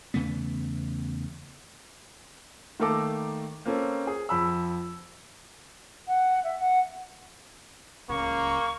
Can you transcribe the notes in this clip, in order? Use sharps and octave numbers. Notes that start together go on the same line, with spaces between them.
E2 C#3 A3 B3
D#3 A3 A#3 A4 A#5 D6
A#3 C4 C#4 A4
G#4
F2 B5 E6
F#5
E5
F#5
D1 C#2 C#3 A#3 C#6